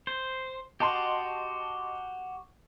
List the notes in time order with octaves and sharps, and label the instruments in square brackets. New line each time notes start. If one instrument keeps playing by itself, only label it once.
[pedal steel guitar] C5
[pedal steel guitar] F#4 G4 [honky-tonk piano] D#5 A5 C6